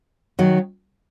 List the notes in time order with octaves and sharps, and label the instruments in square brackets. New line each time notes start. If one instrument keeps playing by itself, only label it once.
[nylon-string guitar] D#3 F#3